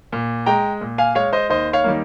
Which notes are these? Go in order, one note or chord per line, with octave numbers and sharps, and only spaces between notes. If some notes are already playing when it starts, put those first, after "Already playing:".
A#2
G#3 G5 A#5
A#2
F5 G#5
G#3 C#5 F5
C5 D#5
D#2 C5 D#5
C#5 F5
D#3 G3 A#3